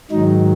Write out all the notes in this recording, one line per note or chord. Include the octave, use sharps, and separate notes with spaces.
G#2 D#3 F#3 D#4